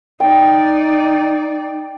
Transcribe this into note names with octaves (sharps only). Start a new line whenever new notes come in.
D#4 D5 G5